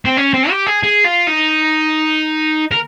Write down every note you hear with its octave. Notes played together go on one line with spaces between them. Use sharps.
C4
C#4
C4
G4
G#4
G#4
F4
D#4
A#4